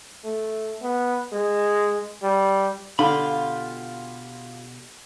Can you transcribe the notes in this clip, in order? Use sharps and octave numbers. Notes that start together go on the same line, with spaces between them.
A3
B3
G#3
G3
B2 D3 F4 G4 B5